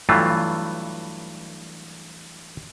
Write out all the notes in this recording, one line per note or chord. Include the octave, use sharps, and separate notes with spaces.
G2 E3 F#3 A3 F4